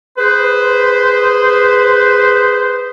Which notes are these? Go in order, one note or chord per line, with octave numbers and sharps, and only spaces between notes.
G#4 B4 C5